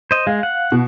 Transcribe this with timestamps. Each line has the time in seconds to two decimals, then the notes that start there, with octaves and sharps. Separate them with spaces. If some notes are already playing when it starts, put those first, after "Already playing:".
0.11 C5 D#5
0.27 G#3 F5
0.43 F#5
0.72 B2